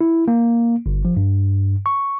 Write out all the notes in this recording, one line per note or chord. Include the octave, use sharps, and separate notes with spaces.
E4
A#3
G1
F3
G2
C#6